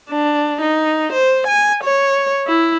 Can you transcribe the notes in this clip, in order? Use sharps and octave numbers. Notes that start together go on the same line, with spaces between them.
D4
D#4
C5
G#5
C#5
E4